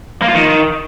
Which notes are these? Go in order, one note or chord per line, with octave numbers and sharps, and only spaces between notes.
A#3
F4
D#3